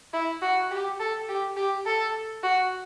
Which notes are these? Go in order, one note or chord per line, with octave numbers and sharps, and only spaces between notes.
E4
F#4
G4
A4
G4
G4
A4
F#4